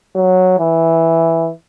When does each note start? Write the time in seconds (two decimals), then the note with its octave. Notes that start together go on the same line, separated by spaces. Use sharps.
0.15 F#3
0.59 E3